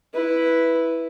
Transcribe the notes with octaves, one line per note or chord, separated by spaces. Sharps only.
E4 B4